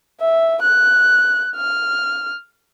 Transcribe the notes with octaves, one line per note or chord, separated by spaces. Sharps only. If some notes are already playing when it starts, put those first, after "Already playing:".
E5
F#6
F6